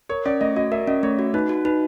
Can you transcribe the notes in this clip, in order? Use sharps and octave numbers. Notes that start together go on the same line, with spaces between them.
A#4 C#5
C#4 D5
A3 D#5
F#4 D#5
A#4 E5
C#4 D#5
A3 C#5
F#4
D#4 B4
F#4
D#4 B4